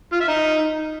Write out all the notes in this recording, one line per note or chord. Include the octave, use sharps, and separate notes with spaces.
F4
E5
D#4